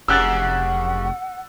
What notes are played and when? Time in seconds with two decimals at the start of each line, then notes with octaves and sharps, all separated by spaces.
0.08 F1 F#2 C#3 G4 F#5 E6 F#6 A6